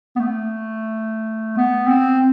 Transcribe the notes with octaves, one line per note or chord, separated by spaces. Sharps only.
B3
A3
B3
C4